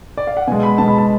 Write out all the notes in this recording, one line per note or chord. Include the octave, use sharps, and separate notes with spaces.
D5
F5
F#5
B2 G#3 G#5
B5
B2 G#3 A5
B5
A5